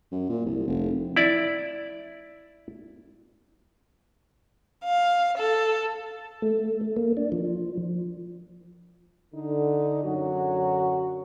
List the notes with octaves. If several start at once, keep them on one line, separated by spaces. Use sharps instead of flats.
F#2
A#2
C2
F1
E4 D5
F5
A4
A3
A#3
D4
F3
D3 D#4
F#2 D3 F#3 F#4